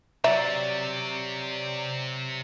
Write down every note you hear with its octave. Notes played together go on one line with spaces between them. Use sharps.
C3 F#3 D5 E5 A#5